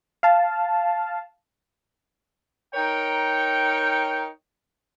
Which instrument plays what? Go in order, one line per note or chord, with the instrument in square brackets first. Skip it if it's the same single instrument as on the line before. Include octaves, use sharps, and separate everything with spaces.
[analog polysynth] F5 A5
[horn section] D#4 A#4 C#5 G5